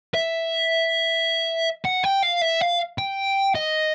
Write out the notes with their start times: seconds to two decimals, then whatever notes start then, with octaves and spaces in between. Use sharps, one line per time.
0.15 E5
1.85 F#5
2.03 G5
2.23 F5
2.42 E5
2.61 F5
2.98 G5
3.55 D#5